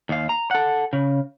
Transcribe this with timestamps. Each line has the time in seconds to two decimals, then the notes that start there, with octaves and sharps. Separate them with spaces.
0.09 D#2 F5
0.29 A#5
0.51 A4 F#5
0.93 C#3